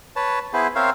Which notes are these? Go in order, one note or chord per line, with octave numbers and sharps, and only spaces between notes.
B4 C#5 A5
B3 E4 G#4 B4 C5
C4 A#4 C5 C#5 E5 F5